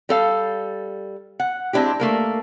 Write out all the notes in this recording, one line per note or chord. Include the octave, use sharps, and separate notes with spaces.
G3 A4 F5
F#5
G#3 C4 D4 E4 G4
A3 A#3 A#4